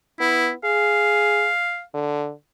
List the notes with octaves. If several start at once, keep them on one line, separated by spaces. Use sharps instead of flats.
B3 E4
G#4 F5
D3